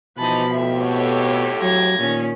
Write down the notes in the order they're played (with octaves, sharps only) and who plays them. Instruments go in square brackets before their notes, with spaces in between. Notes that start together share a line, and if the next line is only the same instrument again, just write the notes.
[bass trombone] B2 [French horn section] E3 D#4 [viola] F3 [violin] A5 B5
[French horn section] F2 A2 G4 [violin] E5
[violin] F#4 [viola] A4 C#5
[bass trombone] F#3 [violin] G#6 A#6
[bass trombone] A#2 [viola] D#3 C#4